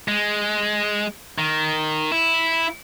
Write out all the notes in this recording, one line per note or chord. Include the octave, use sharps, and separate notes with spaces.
G#3
D#3
E4